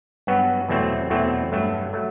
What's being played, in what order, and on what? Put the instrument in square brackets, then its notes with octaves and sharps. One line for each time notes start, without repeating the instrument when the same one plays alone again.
[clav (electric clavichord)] G2 F#3 B3 F#4
E2 B2 F#3 A3 C4
E2 B2 F#3 A3 C4
G2 F#3 A3
F#3 A3